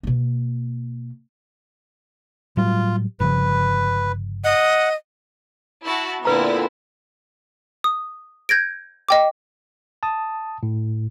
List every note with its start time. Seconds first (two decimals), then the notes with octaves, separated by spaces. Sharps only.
0.03 B2 A#3
2.57 A2 F#3 G3 F4
3.20 G1 C#3 F3 B4
4.44 D#5 F#5
5.83 E4 F#4 A5
6.25 A#2 D3 B3 C4 E4 B4 A#5
7.84 D#6
8.49 G6 G#6 A#6 D7
9.08 D#5 G5 D6
10.03 A5 D#6
10.63 A2